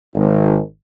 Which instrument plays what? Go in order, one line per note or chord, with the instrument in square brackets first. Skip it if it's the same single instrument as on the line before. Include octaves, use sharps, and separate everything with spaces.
[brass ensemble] G#1